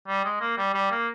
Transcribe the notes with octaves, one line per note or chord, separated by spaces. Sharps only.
G3
G#3
A#3
G3
G3
A#3